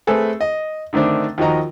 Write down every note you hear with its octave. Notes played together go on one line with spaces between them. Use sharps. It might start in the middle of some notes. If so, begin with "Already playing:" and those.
A3 C4 G#4 A4 B4
D#5
D3 D#3 A3 C4 D4
D#2 F3 F#4 D#5 A#5